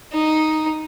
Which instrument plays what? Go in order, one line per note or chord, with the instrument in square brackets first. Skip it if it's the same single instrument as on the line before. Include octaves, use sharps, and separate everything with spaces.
[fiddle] D#4